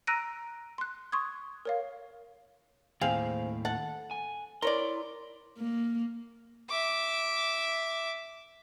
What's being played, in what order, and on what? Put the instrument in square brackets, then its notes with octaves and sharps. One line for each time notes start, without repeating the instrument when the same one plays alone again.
[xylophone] A#5 E6 F#6 A#6 D7 D#7
C6 F#6
C6 C#6 D#6 G#6
A#4 C#5 F5
[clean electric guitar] D#2 A2 [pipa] C4 G#4 F5
[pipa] A4 F#5
[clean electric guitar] G#5
[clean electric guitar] E4 C6 [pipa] A#4 C#5 D5
[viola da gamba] A#3
[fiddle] E5 D6